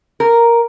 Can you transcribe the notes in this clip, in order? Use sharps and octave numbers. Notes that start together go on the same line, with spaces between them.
A#4